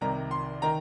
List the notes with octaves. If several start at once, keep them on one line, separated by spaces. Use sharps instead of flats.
C2 C3 D#3 A#5
C6
D#3 A#5